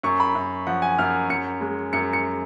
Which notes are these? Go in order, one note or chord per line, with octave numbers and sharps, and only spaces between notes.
F#2 C#6
B5
F#2
F3 F#5
G#5
F#2 F6
F#2 C#7
G#3
F#2 C#7
C#7